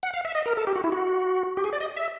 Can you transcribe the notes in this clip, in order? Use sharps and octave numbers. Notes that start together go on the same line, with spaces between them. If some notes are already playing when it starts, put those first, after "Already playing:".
F#5
F5
E5
D#5
A#4
A4
G4
F#4
E4
F#4
G4
G#4
D5
D#5
E5